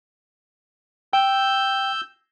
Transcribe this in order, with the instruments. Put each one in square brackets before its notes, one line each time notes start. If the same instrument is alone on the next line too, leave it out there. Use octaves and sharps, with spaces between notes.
[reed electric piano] G5 [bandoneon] E6 G6